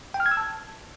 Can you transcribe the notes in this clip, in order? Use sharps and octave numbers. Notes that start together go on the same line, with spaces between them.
G5
F6
G#6
E6
A5